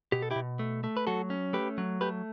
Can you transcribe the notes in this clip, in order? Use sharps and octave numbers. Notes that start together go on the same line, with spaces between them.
B2 G4
A4
E4 G4
B2
A3
A3
B4
F#3 F#4 A4
C#4
A3 G4 B4
F#3
A3 G4 B4